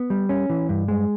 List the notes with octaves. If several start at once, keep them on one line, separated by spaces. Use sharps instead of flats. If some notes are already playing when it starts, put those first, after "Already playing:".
Already playing: B3
G3
C#4
E3
G2
G#3